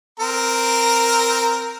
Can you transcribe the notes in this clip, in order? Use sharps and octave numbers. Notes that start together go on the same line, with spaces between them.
C4 A#4 A#5